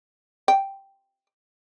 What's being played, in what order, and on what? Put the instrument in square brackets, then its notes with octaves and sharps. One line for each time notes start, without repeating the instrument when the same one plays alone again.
[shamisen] G5